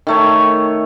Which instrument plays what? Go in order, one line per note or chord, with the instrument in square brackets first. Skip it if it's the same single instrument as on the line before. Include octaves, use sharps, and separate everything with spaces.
[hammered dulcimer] D#3 A3 C#5